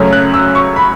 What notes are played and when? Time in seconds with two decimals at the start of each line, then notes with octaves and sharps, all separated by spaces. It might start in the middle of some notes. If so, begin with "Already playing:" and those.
Already playing: F#2 C#3 F#3 A3 C#4
0.13 F#6
0.34 E6
0.55 C#6
0.76 B5